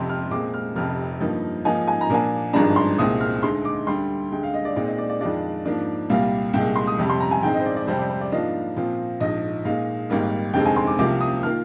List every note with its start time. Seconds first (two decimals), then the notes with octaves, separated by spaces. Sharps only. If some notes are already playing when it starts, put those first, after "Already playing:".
Already playing: F1 F2 C3 C6
0.09 F6
0.31 A#2 G#3 C4 D6
0.54 F6
0.76 F1 F2 C3 F6
1.20 G2 F3 A#3 D#4
1.65 G#2 F3 A#3 D#4 G#5
1.88 G#5
2.01 A#5
2.09 A#2 F3 A#3 D4 G#5
2.53 G#1 G2 F3 G#3 D4 A#5
2.76 C6
2.98 C2 A#2 G#3 C4 D#6
3.21 F6
3.43 D2 D3 G#3 D#4 C6
3.65 D6
3.87 D2 D3 G3 C6
4.32 D2 D3 G#3 G5
4.43 F5
4.54 D#5
4.65 D5
4.76 A#2 G#3 C4 D#4 D5
4.87 D#5
4.98 D5
5.09 D5
5.20 F2 D#3 G#3 D4 F4 D5
5.65 G#2 F3 A#3 D4
6.10 C2 A#2 G3 A#3 F5
6.53 C2 A#2 G#3 G5
6.76 C6
6.87 D#6
6.98 F2 C3 G3
7.10 C6
7.20 A#5
7.31 G#5
7.42 A#1 G#2 D#3 G#3 C4 G5
7.54 D#5
7.59 C5
7.66 D5
7.76 D5
7.87 F2 C3 G3 C4 C5
7.99 D5
8.10 C5
8.21 D5
8.32 G#2 F3 A#3 D4 F4 D#5
8.77 A#2 F3 C4 F4
9.20 A#1 G#2 F3 D#5
9.65 A#2 G#3 D#4 F5
10.10 G#1 G#2 G3 A#3
10.54 F1 D#2 D3 G#3 C4 G5
10.66 G#5
10.76 C6
10.87 D6
10.99 C2 C3 F3 A#3 F4 D6
11.21 D#6
11.43 D#3 A#3 F4 F6